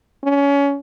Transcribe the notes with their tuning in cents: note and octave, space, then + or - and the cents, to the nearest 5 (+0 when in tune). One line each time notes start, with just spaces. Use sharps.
C#4 +25